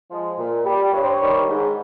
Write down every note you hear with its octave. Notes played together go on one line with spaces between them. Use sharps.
F3 G#3
A#2
G3
G2 C#5
C5
C#5
D#3 G3
G#2